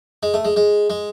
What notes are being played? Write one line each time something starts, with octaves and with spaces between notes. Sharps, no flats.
G#3
A3
G#3
G#3
G#3